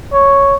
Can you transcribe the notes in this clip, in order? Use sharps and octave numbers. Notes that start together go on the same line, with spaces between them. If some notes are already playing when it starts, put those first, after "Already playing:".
C#5